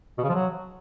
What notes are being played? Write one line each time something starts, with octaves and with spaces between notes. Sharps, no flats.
B2
C#3
F3
F#3